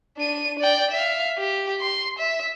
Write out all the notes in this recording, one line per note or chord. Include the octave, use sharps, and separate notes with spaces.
D4 D#7
D5 G5
E5 F5
G4
C6
E5